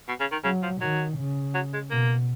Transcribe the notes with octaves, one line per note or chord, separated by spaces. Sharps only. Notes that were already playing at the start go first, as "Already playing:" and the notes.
B2
C#3
D#3
C#3 F#3
F3
D#3 F#3
C#3
F#3
G#3
B2 A#3